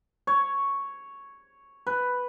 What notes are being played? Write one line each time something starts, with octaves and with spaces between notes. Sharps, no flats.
C#5
B4